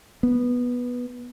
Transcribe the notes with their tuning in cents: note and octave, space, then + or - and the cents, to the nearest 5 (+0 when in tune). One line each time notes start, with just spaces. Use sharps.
B3 -10